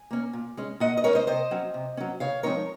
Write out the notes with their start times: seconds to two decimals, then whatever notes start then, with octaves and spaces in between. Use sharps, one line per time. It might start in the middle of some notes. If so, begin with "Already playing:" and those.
Already playing: G#5
0.11 A#3 C#4
0.33 A#2
0.57 G#3 C#4
0.80 A#2 D#5 F#5
0.97 D#5
1.04 G#3 C#4 A#4 C#5
1.15 C5 D#5
1.27 C3 C5 D#5
1.51 F#3 C#4
1.74 C3
1.97 F#3 C#4
2.20 C#3 C#5 F5
2.43 F3 G#3 C4 D#4 A#4 C#5